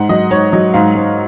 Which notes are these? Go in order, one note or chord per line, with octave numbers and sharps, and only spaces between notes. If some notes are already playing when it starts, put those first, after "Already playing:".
Already playing: G#2 F#5
F#3 D#5
G#2 C#5
F#3 D#5
G#2 F5
G#2